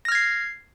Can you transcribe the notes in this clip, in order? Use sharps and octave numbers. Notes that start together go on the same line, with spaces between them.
F6 G#6 A#6 C7